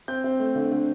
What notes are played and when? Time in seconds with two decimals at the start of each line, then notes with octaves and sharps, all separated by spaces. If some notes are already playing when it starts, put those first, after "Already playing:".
0.08 C4 G6
0.24 C4
0.40 A3
0.55 D3
0.71 D3